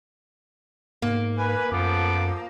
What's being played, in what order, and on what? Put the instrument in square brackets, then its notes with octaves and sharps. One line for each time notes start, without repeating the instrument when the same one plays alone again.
[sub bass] G#2 [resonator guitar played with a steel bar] A#3
[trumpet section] B4 [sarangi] G#5
[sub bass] F#2 [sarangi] F3 [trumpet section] B3 A4 D6